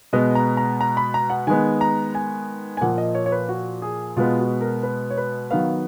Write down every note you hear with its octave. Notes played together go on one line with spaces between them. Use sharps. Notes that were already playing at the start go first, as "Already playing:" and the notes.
B2 G#3 B3 D#5
A#5
A#5
A#5
B5
A#5
F#5
D#3 G#3 B3 G#5
A#5
G#5
G#5
A#2 F3 A#3 F#5
D#5
C#5
C#5
B4
F#4
G#4
B2 G#3 B3 F4
F#4
A#4
B4
C#5
B4
D#3 F#3 B3 F5